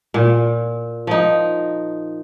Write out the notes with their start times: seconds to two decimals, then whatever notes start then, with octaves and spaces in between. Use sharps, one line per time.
0.14 A#2
1.07 F3 D#4